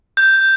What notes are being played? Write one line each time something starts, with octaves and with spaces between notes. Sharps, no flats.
G6